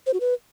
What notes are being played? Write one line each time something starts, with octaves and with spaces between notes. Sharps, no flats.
C5
F#4
B4